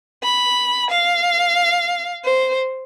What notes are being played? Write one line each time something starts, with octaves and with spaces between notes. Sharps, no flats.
B5
F5
C5